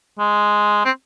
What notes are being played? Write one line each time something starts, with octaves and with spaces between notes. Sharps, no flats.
G#3
C4